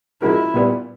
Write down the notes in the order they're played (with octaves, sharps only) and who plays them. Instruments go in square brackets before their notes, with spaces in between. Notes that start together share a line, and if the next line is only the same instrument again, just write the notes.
[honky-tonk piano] F3 G#3 C#4 F#4 A#4 [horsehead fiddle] E4
[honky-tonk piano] A#2 G3 B3